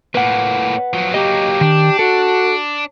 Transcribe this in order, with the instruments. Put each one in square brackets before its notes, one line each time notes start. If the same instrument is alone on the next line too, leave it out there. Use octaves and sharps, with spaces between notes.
[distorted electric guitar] A2 A#3 [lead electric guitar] B4 F#5
[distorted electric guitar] F3 F#3
[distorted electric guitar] F#3 A#3 [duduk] G4 [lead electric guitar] D#5
[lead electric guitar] D#3 [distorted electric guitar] D4
[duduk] F#4 [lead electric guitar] A4